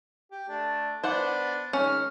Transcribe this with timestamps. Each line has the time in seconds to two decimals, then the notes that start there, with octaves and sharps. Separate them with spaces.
0.31 G4
0.49 A3 D4 A5
1.04 B3 D4 C5 D5 F#5
1.73 D#3 G#3 C#4 F6